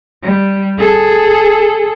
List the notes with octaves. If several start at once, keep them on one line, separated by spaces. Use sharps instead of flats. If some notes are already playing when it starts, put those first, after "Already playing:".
G3
G#4 A4